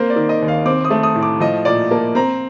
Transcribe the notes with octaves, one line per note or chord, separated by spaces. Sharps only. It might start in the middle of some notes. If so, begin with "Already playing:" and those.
Already playing: A#3 C4 C5
D5
D#3
D#5
D#2
F5
C4 D6
D#6
A3
D#6
A2
D6
F3 D#5
A#2 D5
A#3 A5
C4 A#5